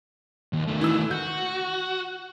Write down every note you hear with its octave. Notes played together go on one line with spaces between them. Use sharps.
D#2
D#3 A3
E3 E6
F#4 G6